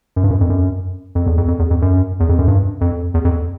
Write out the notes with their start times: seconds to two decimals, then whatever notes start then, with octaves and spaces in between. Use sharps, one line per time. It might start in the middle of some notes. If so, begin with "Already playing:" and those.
0.16 F#2
0.24 G2
0.30 F#2
0.41 F2
0.50 F#2
1.15 F2
1.27 E2
1.38 F2
1.48 F2
1.59 E2
1.71 F2
1.82 F#2
2.20 E2
2.29 F2
2.39 F#2
2.48 G2
2.81 F2
3.14 E2
3.25 F2